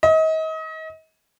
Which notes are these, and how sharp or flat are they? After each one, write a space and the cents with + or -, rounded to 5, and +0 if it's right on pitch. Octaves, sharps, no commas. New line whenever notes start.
D#5 +35